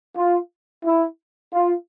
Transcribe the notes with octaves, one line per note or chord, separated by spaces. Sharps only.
F4
E4
F4